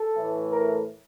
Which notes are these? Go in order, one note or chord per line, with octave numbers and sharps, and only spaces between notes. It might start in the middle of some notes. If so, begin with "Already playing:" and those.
Already playing: A4
A2 E3 A3
A#4